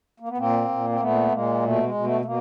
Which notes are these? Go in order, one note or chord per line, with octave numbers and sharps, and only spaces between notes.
A#3
B3
A#2 A#3 C4
A#2
C4
A#2 A3 B3
A#2 G#3 A#3
B2 A3
G#3
B2
A3
A3
B2 A#3